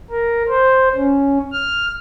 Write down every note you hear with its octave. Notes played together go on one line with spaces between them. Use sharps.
A#4
C5
C#4
F6